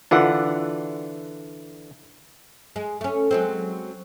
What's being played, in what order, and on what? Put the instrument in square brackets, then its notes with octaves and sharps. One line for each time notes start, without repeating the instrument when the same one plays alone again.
[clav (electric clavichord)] D3 E3 D4 [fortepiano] F4 F#5
[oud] G#3
A3 C#4
F#3 G#3 C4